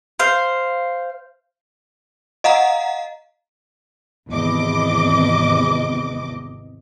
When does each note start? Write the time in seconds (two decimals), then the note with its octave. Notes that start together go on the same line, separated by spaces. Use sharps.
0.19 C5 F5
2.44 D#5 F5 F#5 A#5
4.29 G#1 E2 C3 D#5 D6